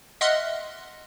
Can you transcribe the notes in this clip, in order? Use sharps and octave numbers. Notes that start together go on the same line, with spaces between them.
D#5 E5 F#5 C6 F6 F#6